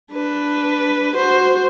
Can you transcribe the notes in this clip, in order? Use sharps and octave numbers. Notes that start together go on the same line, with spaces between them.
D4 B4
F#4 C5